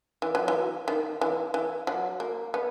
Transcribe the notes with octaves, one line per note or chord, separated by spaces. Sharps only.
E3
F#3
E3
D#3
E3
E3
F#3
A#3
B3